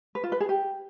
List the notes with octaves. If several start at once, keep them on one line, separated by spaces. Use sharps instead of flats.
B4
F4
B4
G#4
G4